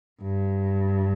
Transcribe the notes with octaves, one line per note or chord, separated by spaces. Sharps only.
G2